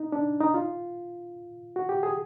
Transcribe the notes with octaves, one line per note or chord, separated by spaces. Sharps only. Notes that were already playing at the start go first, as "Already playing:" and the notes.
Already playing: D#4
D4
D#4
F4
F#4
G4
G#4